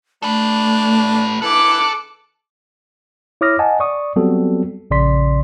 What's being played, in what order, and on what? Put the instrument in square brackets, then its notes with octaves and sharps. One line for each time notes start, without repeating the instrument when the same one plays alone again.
[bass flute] A3 [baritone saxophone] D4 [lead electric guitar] A4 B4
[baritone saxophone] E3 [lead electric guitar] A4 [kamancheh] D6 F#6
[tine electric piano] E4 C#5 D6 D#6 F6 A#6
D#5 F#5 G#5 A5
D5 C#6 D#6
F#3 G3 B3 C4 F#4 A4
A#1 C#3 D5 C6 B6